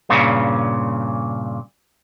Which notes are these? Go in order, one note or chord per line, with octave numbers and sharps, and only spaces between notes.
G2 A#2 C#3